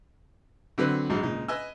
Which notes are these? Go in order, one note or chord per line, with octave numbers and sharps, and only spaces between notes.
D3 F#3 C4 D4 B4
A#1 G#2 F#3 D#4
C#2 A#2 D#4
B4 D#5 G#5 E6